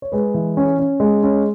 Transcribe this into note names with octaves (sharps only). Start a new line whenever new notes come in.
C#5
G#3 G#4 B4
E3
C#4
C#4
G#3
C#4